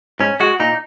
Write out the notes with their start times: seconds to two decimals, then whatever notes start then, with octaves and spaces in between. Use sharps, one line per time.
0.20 G#2 C#4
0.40 G#3 F#4
0.60 A#2 D#4